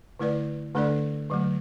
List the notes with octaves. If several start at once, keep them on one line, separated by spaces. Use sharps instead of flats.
D3 A3 E4 B4 D5
D3 A3 D4 A4 D5
D3 F#3 A3